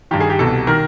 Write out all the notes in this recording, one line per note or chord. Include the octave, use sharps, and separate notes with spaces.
G2 D#3 G4
G#4
G4
C2 B2 A4
D#3 A#4